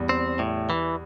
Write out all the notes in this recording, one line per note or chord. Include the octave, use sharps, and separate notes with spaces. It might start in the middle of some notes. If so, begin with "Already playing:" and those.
Already playing: E2 G3
C4
A2
E3